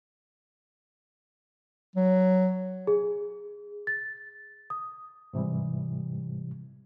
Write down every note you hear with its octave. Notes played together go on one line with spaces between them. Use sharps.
F#3
G#4
A6
D#6
G#2 C3 E3 G3